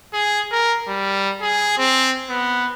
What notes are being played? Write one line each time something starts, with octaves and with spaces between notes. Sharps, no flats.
G#4
A#4
G3
G#4
C4
B3